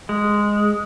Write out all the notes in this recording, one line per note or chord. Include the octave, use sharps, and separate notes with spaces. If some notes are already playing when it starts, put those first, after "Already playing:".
G#3